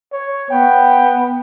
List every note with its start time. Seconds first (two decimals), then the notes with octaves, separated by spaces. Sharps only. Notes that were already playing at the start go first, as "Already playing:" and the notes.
0.12 C#5
0.51 B3 G5